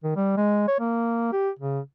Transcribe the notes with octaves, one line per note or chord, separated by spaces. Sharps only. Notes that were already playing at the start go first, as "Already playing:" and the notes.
D#3
G3
G#3
C#5
A#3
G4
C#3